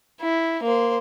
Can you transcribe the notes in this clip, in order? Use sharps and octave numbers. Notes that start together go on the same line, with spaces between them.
E4
A#3 C5